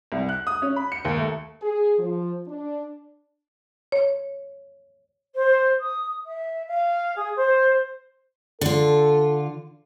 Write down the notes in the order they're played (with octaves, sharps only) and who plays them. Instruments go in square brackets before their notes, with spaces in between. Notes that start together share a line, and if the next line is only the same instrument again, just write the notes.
[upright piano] C2
F#6
D#6
C#4
B5
C#7
D#2
A3
[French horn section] G#4
F3
D4
[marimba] C#5
[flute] C5
D#6
E5
F5
G#4
C5
[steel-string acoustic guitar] D3 F4 [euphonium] A4